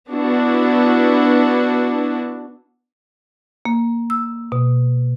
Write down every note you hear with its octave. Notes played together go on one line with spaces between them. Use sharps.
B3 D4 E4 F#4
A#3
E6
B2